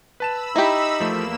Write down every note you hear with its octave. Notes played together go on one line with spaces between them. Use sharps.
B4 A5 B5 E6 E7
D#4 E4 G4 A#5
E2 F3 A3 A#3 E7